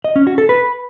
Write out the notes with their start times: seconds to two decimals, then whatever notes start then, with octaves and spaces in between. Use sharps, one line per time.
0.04 D#5
0.16 C#4
0.27 F#4
0.38 A4
0.49 B4